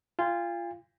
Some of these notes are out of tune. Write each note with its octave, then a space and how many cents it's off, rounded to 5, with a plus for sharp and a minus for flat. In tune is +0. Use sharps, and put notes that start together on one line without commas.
F4 -15 G#5 -45